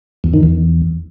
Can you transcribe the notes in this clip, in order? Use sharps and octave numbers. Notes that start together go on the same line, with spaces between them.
E2
D#3
E2